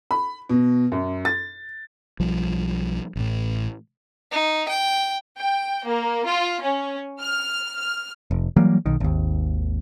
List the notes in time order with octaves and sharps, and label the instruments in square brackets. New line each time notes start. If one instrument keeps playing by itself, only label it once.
[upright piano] B5
B2
F#2
A6
[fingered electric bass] B1 F3 G3
A1 A2
[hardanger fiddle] D#4
G5
[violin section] G5
A#3
F4
C#4
F6
F6
[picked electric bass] F1
E3 F#3 G3 A#3
B1 D#3
G#1 D#2